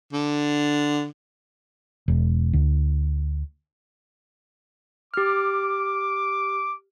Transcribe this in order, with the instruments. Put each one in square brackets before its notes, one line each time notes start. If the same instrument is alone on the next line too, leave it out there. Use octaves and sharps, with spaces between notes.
[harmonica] D3
[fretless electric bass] E1
D2
[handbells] G4 F6 [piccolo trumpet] D6